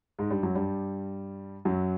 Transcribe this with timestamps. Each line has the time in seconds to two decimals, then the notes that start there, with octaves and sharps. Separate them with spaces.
0.19 G#2 G#3
0.31 G2 G3
0.43 F#2 F#3
0.55 G2 G3
1.65 F#2 F#3